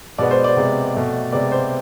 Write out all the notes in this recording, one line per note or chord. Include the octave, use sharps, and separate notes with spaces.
B2 G#3 B3 D5
C5
D5
C3 G#3 B3
B2 A3
C3 G#3 B3 D5
C5